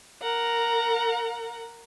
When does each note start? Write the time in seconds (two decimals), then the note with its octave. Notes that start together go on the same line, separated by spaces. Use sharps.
0.21 A#4 F#5 A#5